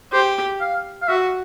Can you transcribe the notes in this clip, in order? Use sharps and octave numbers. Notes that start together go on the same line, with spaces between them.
G4 C5
F5
F5
F#4 E5